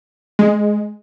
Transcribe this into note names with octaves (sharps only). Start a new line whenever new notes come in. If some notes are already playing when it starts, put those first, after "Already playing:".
G#3